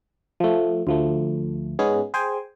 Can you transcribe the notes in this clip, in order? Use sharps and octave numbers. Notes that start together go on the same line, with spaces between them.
F3 A3
D2 F3 A3
G#2 G#3 B3 C#4 G#4
G#4 C5 G5 G#5